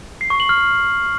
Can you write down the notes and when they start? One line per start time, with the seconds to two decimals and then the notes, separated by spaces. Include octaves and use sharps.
0.21 C7
0.30 C#6
0.40 F#7
0.49 F6